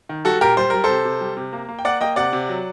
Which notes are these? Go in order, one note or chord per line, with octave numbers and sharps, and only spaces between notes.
D#3
G3 F#4 A4
A#2 G4 A#4
G3 C5
G3 A#4
A4 C5
C3
C3
G3
C3
A#3
A#3
G5
A#3 D5 F#5
A#3 D#5 G5
C3 D5 F#5
C3
F#3